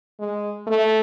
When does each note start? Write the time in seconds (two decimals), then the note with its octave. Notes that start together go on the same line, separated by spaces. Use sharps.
0.19 G#3
0.67 A3